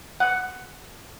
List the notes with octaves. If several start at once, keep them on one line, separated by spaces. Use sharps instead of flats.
F#5